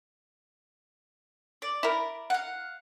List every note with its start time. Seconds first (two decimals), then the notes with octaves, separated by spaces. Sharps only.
1.62 D5
1.83 E4 A#4
2.30 F5 F#5